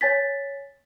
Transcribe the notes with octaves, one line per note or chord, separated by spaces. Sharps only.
C#5 G#5 A6 B6